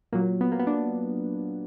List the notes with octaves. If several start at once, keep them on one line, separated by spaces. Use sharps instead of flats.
A#2 F#3 A#3
B3
A#3
B3
D4